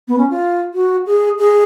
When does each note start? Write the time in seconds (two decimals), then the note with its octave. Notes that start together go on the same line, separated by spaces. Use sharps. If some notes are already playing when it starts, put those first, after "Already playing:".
0.08 B3
0.18 C#4
0.30 F4
0.74 F#4
1.06 G#4
1.38 G#4